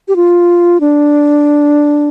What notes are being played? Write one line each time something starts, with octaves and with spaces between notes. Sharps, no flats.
G4
F4
D4